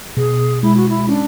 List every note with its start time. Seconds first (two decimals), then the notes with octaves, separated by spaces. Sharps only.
0.17 B2 G#4
0.63 G#3 E4
0.76 F#4
0.89 E4
1.09 C#4 D4